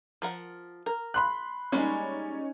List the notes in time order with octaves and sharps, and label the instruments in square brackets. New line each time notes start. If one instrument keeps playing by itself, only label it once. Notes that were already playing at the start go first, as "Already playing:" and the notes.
[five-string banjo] F3 A#4 F#5
A#4
[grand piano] B5 C6 F#6
[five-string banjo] G3 G#3 A#3 [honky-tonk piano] C#4 D#4